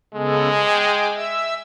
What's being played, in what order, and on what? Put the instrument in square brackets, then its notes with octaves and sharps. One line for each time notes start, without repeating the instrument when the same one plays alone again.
[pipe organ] C#3 B3 A4 [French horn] G#3
[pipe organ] G5 G#5 D6
E5 E6